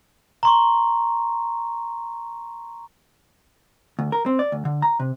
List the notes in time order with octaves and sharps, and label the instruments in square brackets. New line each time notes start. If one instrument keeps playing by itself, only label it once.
[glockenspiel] A#5 C6 C#6
[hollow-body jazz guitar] D2
A#4
C4
D5
D2
D3
A#5
C3